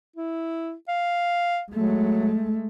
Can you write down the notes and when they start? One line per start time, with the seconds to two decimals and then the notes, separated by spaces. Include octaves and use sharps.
0.16 E4
0.88 F5
1.72 F#3 G#3 A3